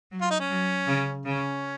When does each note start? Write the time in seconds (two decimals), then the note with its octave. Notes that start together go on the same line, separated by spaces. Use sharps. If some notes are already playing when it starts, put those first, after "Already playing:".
0.11 F#3
0.21 F4
0.31 D#4
0.40 C#4
0.50 F#3
0.87 C#3
1.25 C#3 C#4